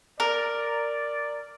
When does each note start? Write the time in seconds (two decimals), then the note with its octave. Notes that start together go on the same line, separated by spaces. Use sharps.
0.20 A#4 D5